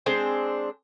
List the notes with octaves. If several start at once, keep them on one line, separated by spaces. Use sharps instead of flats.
G#3 C4 D4 C5